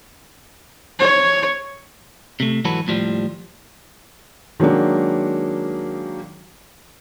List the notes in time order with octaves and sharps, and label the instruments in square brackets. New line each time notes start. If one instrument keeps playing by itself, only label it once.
[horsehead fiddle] C#5
[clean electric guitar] C3 A3
G#2 E3 F#3 F#4 A4 B4
D#2 A2 F3 G3
[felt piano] D#3 F#3 G#3 A#3 D4